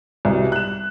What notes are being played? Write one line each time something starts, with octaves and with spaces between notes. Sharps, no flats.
C2 B2
F#6 E7